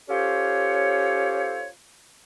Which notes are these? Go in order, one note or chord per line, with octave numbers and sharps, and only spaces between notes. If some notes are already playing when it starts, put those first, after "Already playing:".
C#4 F4 G4 A4 C5 C#5